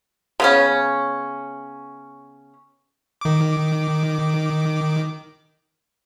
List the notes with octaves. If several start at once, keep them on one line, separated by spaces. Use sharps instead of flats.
C#3 B3 C#4
D#3 D6